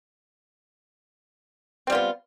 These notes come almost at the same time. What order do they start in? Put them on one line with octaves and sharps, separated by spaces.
C4 G3 F4 B3